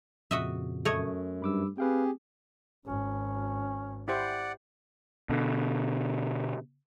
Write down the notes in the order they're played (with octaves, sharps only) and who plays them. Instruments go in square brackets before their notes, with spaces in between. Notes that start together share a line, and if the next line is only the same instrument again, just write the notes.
[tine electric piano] F2 A#2 C#3 [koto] F#4 D#5 E5
[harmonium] F#2 [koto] A3 C#5 D#5
[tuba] G2 [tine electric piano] B5 D6 E6
[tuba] C4 [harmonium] G4 G#4 [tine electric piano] B4 F5 G5
[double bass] G#1 [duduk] C#4
[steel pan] E4 G4 C5 [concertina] D5 F#5
[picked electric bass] B2 D3